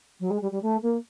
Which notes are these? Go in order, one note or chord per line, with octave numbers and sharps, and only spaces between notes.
F#3
G#3
G3
G3
A3
A#3